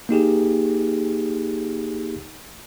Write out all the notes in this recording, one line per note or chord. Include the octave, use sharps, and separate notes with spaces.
A#3 D#4 G4 G#4